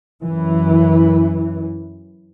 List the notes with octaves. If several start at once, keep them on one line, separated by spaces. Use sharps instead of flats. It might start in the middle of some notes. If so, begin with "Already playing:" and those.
F#2 E3